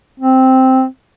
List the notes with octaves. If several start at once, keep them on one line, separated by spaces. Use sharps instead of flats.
C4